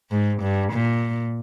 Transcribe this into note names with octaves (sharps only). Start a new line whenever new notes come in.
G#2
G2
A#2